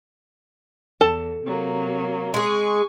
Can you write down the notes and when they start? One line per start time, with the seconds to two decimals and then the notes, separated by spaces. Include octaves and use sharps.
1.01 E2 A4 A5
1.44 C3 F#3 A#3
2.34 G#3 G#4 G#5 C#6